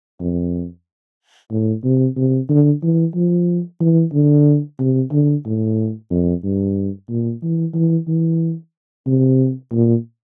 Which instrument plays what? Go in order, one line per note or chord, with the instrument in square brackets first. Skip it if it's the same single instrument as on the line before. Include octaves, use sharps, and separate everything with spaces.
[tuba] F2
A2
C3
C3
D3
E3
F3
E3
D3
C3
D3
A2
F2
G2
A#2
E3
E3
E3
C3
A#2